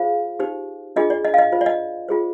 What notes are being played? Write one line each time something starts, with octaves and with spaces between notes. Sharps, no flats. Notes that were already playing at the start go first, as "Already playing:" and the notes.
Already playing: F4 G#4 C5 F5
D#4 G4 C5
D4 F4 G#4 D#5
D5
D#5
F5
D#5
F4 C5
D5
D#5
F4 G#4 C5